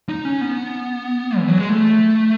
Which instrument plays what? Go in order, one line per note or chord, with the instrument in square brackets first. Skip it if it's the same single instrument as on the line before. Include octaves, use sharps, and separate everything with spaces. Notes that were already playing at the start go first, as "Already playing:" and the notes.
[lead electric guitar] D#4
C#4
B3
E3
F#3
G#3
A3